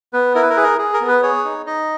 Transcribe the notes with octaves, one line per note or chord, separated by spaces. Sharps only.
B3 B4
E4 A#4
B4
A#4
G#4 B4
A#4
G#4
A#4
B3
B4
G#4 C#5
D#4
D#4 D#5